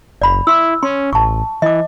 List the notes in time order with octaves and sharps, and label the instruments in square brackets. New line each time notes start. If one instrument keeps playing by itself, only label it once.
[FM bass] F#1 [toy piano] D5 B5
[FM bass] E4 [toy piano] C6 E6
[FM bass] C#4 [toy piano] C6
[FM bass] A1 [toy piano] A5 C#6
[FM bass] E3 [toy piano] D#5 D6